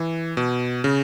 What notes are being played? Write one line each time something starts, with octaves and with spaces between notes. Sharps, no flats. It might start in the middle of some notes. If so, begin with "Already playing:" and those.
Already playing: E3
B2
C#3